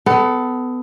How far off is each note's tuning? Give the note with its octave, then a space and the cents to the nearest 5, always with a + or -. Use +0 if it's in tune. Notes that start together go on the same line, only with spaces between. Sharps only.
B3 +25 A4 +0